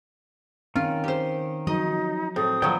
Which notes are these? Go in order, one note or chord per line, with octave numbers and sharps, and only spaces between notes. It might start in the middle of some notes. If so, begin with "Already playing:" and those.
D#3 C4 C#4 F4
G4 C5
F3 F#3 D#4 D#5
A2 C4 D#6
F3 F#3 B3 D5 G5